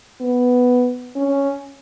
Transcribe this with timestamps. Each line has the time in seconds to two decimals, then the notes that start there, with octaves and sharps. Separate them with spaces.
0.21 B3
1.16 C#4